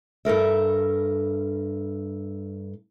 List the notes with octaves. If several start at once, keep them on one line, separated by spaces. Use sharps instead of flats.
G2 A4 A#4 E5